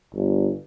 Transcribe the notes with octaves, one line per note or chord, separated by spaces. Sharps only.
G1